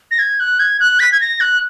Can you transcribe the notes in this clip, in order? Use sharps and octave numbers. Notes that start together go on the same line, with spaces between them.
A#6
G#6
F#6
G#6
F#6
B6
G#6
A#6
F#6